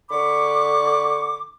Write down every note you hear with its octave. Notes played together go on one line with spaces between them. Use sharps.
D3 B5 C#6 D6